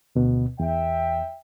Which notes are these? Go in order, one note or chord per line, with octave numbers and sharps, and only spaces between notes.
D2 B2
E2 E5 G5